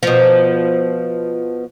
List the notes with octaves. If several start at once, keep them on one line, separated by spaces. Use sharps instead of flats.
B2 F3